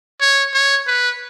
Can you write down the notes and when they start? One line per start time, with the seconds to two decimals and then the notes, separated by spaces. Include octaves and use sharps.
0.21 C#5
0.54 C#5
0.87 B4